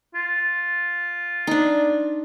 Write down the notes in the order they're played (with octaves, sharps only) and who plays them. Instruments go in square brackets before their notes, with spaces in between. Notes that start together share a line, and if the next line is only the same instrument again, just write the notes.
[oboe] F4
[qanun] D4 D#4